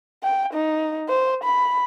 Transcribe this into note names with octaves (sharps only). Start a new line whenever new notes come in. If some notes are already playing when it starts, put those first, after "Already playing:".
G5
D#4
C5
B5